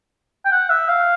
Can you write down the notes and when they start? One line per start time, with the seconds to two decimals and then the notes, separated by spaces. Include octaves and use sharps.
0.45 G5
0.52 F#5
0.70 E5
0.89 F5